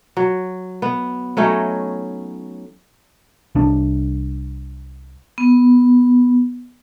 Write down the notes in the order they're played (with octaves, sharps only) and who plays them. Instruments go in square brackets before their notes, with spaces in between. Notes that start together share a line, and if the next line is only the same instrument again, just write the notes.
[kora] F#3
B3
F#3 A3 C#4 D#4
[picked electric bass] C2 D4
[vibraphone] B3